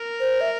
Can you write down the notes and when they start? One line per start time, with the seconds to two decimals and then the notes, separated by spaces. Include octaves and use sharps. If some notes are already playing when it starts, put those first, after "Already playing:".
Already playing: A#4
0.20 C5
0.41 E5